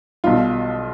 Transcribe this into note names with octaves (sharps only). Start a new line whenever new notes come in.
B1 B2 G3 F4